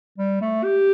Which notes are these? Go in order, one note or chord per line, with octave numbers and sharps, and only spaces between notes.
G3
A3
G4